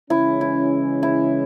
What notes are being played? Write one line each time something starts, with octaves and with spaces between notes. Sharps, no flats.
C#3 E3 G#3 C#4 E4
E4
E4